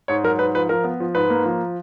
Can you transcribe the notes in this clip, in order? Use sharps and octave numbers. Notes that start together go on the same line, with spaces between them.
G#2 C#5
F#3 A#4
G#2 B4
F3 B4
F3 A#4
B3
F3
G#2 B4
A#3
F3